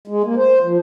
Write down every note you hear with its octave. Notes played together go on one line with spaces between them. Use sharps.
G#3
A#3
C5
F3